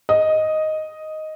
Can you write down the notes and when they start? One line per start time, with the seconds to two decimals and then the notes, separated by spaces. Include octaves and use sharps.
0.09 D#5